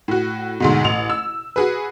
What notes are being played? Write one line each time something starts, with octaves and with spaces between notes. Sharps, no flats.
A2 F#4
D2 G#2 B2
A1 F7
E6
F#4 G#4 B4